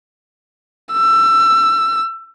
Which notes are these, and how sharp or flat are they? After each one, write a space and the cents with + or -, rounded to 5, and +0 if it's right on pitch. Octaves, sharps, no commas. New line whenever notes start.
E6 +25